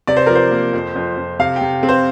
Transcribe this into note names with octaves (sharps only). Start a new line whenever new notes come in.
C3 D5
C5
F3 A#4
C5
A#3
F2
F2
F2
C3 F5
G5
C3
C4
C5